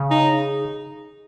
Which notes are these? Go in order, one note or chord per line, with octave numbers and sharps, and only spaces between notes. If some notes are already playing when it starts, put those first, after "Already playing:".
Already playing: C#3
D#4